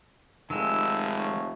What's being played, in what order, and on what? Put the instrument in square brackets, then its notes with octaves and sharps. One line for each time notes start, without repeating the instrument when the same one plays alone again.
[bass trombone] F1 [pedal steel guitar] D#3 G#3 [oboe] E6
[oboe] C#5